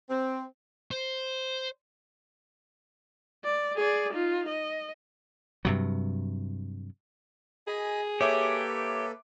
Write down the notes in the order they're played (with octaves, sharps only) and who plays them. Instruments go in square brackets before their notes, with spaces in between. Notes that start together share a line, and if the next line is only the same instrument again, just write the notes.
[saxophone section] C4
[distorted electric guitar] C5
[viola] D5
G#4 D5
D#4 F4
D#5
[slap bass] G2 C3 F#3
[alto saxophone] G#4 [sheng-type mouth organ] D#5 G#5 B5
[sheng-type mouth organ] A#3 A4 B4 [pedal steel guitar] G4 [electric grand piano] C#5 E5 D6